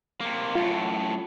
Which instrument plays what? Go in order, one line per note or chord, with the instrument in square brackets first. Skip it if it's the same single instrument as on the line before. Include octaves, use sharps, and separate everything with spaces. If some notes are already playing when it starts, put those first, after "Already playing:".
[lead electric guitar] C3 A#3
[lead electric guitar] F#2 A2 [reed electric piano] F4